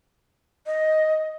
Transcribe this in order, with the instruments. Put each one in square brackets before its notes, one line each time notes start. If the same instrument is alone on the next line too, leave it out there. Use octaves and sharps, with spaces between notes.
[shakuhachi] D#5